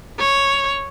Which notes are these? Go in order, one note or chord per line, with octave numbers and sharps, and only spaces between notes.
C#5